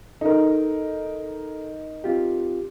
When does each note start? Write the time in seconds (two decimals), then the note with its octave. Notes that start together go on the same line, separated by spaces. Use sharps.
0.21 D#4 A4 A#4
2.04 C4 F4 G4